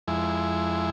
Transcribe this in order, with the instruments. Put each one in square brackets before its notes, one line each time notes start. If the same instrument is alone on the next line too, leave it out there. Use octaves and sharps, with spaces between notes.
[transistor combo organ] F2 G#3 E4